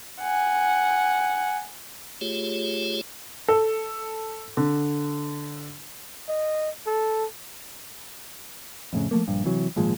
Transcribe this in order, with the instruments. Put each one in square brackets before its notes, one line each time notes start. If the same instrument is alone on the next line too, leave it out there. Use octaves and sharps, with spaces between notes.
[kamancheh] F#5 G#5
[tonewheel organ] A3 F4 G4 G#4 C#5
[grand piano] A4
D3
[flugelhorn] D#5
A4
[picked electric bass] F2 A2 C#3
F3 A3 A#3
A#1 G2
C3 E3 F#3
G#1 A#2 F3 G#3